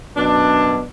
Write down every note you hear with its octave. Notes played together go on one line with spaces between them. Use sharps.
F#2 B2 D4